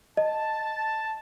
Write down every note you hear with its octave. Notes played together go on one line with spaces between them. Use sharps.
D#5 A5